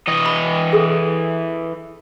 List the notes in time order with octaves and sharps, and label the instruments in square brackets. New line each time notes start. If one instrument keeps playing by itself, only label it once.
[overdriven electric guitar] E3 D#5
[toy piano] B5
G#4 A4